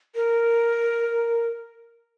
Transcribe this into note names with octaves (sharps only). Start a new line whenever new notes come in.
A#4